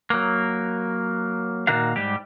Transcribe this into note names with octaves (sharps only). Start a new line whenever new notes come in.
F#3 A#3
A#2 D#3 A#3 F#4 F5
G#2 G3 G4